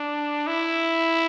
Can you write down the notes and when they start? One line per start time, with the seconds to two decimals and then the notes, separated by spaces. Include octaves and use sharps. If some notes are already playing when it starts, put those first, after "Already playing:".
Already playing: D4
0.47 E4